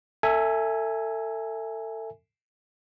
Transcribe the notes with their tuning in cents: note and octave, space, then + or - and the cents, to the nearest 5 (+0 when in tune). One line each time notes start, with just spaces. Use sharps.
A4 +30 E5 +0 G#5 +0